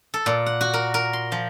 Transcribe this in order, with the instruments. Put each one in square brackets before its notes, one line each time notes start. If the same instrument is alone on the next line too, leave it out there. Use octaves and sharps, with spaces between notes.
[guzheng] A4
A#2
F#5
F#4
A#4
A#4
C6
F3